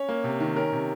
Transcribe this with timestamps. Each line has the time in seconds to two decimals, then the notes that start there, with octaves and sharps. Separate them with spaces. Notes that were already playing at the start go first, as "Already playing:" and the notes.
Already playing: C#4 C#5
0.09 A#3
0.24 C3
0.40 D#3
0.56 C#4 A#4
0.73 C3